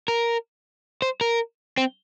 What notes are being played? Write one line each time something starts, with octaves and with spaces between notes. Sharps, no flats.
A#4
C5
A#4
C4